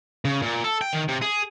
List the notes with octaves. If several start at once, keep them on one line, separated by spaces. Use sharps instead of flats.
C#3
A#2
A4
G5
D#3
C3
G#4